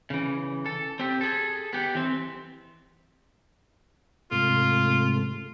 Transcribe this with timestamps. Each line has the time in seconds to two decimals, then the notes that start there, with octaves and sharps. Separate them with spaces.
0.10 C#3 E3
0.66 A4
0.99 C4 G4
1.21 G#4 A4
1.73 B3 G4
1.95 E3 C4
4.31 G#2 C3 A3 F4